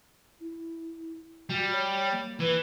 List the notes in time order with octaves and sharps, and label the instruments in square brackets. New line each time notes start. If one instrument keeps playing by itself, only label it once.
[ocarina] E4
[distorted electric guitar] G3 [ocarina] F#4
[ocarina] C#5
A#3
[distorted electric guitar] E3 [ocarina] B4